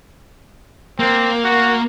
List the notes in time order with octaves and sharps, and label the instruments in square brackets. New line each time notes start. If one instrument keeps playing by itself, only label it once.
[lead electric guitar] A#3 [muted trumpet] C4
[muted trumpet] F#4